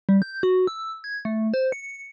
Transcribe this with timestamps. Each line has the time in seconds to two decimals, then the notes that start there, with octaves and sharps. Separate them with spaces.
0.09 G3
0.22 G6
0.43 F#4
0.67 E6
1.04 G#6
1.25 A3
1.54 C5
1.72 C#7